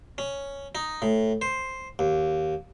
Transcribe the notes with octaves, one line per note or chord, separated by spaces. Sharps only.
C#4
D#4
A2
C5
D#2